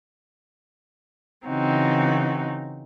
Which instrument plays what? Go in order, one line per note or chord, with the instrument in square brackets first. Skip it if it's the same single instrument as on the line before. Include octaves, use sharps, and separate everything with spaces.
[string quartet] C#3 E3 C4 D#4 F#4